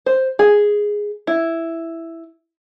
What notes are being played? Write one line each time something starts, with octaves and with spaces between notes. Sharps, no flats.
C5
G#4
E4